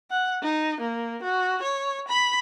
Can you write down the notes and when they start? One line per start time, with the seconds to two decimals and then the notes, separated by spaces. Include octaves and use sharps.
0.11 F#5
0.42 D#4
0.80 A#3
1.23 F#4
1.62 C#5
2.08 B5